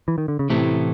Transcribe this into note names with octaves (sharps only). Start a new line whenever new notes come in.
E3
D#3
D3
C#3
A2 C3 E3 A3